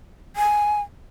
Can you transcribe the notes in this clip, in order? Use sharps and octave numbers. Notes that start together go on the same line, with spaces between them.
G#5